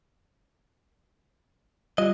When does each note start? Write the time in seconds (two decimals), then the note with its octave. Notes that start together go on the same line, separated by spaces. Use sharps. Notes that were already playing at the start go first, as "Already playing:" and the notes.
1.98 G3 F4 D#5